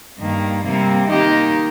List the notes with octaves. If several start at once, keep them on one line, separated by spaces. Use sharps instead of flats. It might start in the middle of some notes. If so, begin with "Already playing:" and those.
G2 D#3 A#3
C3 G3 A#3
D#3 A#3 D#4 G4